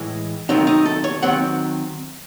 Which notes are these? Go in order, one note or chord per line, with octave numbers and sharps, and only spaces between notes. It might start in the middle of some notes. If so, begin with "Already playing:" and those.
Already playing: A2 E3 G#3
D#3 F#3 A3 C4 D#4
D#4
A4
C#5
D#3 F#3 C4 F#5